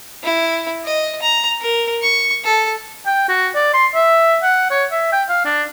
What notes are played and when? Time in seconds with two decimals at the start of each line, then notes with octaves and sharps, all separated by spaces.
0.23 E4
0.85 D#5
1.22 A#5
1.61 A#4
2.02 C#6
2.44 A4
3.06 G5
3.29 F#4
3.55 D5
3.74 C6
3.95 E5
4.43 F#5
4.71 C#5
4.92 E5
5.12 G5
5.29 F5
5.45 D4